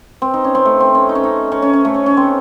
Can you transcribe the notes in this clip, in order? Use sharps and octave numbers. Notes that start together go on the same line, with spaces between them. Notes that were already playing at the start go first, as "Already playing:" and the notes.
C4
D#4
C#4
C4
A3
C4
C#4
D#4
C#4
D#4
C#4
C#4
C#4
A3
C#4
C#4
C4